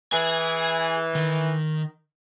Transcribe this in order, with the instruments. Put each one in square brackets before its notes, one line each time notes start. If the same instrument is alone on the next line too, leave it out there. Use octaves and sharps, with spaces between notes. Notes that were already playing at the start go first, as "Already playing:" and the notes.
[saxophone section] E3 [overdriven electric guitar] G#4 G#5
[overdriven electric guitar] D#3